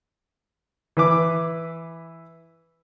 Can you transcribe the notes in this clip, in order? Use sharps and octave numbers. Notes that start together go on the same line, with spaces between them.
E3 B4 D6